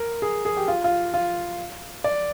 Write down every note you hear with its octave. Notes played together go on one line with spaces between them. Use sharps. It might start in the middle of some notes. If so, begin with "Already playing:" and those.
Already playing: A#4
G#4
G#4
G4
F4
F4
F4
D5